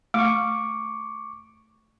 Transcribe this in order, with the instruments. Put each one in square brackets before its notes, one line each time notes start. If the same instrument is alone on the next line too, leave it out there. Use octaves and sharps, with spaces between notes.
[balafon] A3 [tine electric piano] C#6 D6